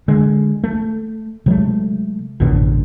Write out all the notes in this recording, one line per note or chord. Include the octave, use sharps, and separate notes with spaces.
D3 G#3
A3
C3 F#3 G#3 A3
A1 F#2 B2 D3